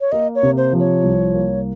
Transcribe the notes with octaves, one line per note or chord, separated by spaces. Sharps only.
C#5
A#3 D#5
C#5
C3
C5
F3
C#5
C2
A#3